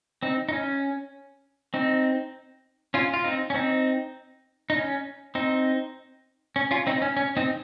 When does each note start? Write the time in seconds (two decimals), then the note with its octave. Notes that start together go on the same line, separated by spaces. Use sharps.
0.23 C4 D#4
0.49 D#4
0.53 C#4
1.74 C4 D#4
2.94 C#4 F4
3.14 F4
3.24 C4 D#4
3.50 C#4
3.54 C4 D#4
4.70 D#4
4.76 C#4
5.35 C4 D#4
6.56 C#4
6.71 C#4 F4
6.87 C4 D#4
7.02 C#4
7.17 C#4
7.37 C4 D#4